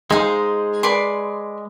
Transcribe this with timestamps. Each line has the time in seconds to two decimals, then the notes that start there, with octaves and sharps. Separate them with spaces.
0.10 G#3 D#4 G#4 C5 F5
0.83 B4 D5 G#5 C6